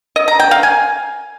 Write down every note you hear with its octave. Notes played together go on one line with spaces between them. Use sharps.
D#5
A#5
G5
F5
G#5